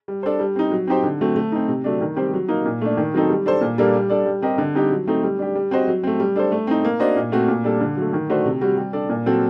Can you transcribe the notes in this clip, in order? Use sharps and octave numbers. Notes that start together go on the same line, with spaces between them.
G3
D4 A4 C5
G3
C4 D#4
F#3
C4 D#4 G4 C5
D3
F#3 A3 C4
A3
C4 D#4
C3
F#3 A3 D4
D#3
G3 C4 G4 C5
F#3
A#3 D#4
A#2
A3 D4
D#3
F#3 C4 D#4 A4
G3
D4 A4 C5
A#2
G3 A#3 D4 A4
G3
D4 A4 D5
G3
C4 G4 A#4 D#5
D3
G3 C4 D#4 G4
F#3
A3 C4 D#4 A4
G3
D4 G4
G3
C4 F#4 C5 D#5
F#3
A3 C4
G3
D4 A4 C5
A3
C4 D#4
A#3
D4 F#4 C5 D#5
A#2
A3 C4 F#4
A#2
G3 D4 A4
D3
F#3 A3
D#3
A3 D4 F#4 C5
C3
G3 C4 F#4
G3
D4 A4 D5
A#2
F#3 C4 F#4 A4